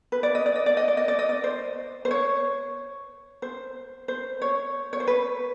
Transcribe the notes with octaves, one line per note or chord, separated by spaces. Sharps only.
B4
D5
D#5
D5
D#5
D5
D#5
D5
D#5
D5
D#5
D5
C5
C5
C#5
C5
C5
C#5
C#5
C5
B4